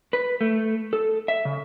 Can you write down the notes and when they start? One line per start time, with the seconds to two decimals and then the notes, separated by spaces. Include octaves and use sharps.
0.13 B4
0.41 A3
0.93 A4
1.28 E5
1.45 C#3